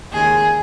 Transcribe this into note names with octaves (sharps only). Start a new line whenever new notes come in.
D#2 C#3 G#3 G#4